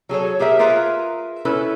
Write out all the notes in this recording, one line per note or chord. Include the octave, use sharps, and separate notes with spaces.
F#3 G#4 A4 C#5
G4 G#4 A#4 E5
F4 G#4 A#4 B4 E5
C#4 E4 A4 B4